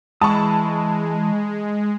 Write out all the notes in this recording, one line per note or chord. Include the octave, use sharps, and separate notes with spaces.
E3 G#3 A5 B5 C#6 D#6